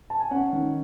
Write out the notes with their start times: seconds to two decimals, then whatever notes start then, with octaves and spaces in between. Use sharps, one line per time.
0.10 A5
0.20 G#5
0.31 C#4 F#5
0.53 D#3